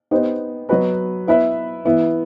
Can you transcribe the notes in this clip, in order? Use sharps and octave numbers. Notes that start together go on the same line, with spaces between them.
B3 D#4 G4 C5 D#5
F#3 B3 F#4 B4 D#5
B3 E4 B4 E5
E3 B3 E4